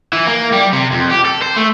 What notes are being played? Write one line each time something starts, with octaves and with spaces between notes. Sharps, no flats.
E3
A#3
G3
C3
F2
G4
A4
C5
A3